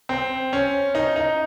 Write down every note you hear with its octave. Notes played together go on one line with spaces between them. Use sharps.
C4
C#4
D#4
D#4